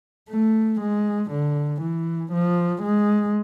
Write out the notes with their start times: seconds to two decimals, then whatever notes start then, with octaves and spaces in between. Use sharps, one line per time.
0.30 A3
0.81 G#3
1.31 D3
1.82 E3
2.33 F3
2.83 G#3